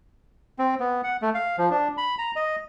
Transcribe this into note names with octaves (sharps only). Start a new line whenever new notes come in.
C4
B3
F#5
A3
F5
F3
D4
B5
A#5
D#5